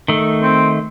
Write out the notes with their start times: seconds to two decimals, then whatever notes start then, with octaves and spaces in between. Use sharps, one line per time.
0.08 D#3 A3
0.42 C4